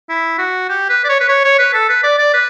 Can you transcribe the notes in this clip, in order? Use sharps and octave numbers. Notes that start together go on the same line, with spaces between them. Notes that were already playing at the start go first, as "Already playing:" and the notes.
E4
F#4
G4
B4
D5
C#5
B4
C#5
C#5
B4
A4
B4
D5
D5
B4